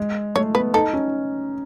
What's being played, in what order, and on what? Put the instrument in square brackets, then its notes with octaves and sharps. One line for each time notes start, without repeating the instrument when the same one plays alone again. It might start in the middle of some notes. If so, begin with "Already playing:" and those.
Already playing: [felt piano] G#3
[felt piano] A3 [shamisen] C#5
[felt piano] B3 [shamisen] B4
[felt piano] D#4 [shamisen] A4
[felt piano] C#4